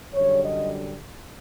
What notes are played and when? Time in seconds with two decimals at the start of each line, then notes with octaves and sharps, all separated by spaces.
0.13 F#2 D3 G3 C#5
0.44 D#5